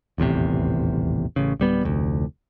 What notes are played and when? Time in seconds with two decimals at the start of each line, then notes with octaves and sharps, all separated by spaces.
0.18 D#1 A1 E2 C3
1.36 A1 C#3
1.60 D1 G3 B3
1.83 F1 D2